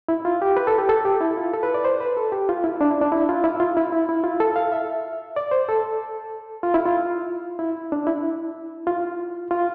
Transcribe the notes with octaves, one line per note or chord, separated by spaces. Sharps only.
E4
F4
G4
B4
A4
G4
A4
G4
E4
F4
A4
B4
D5
C5
B4
A4
G4
F4
E4
D4
E4
D4
E4
F4
E4
F4
E4
E4
E4
F4
A4
F5
E5
D5
C5
A4
F4
E4
F4
E4
D4
E4
F4
F4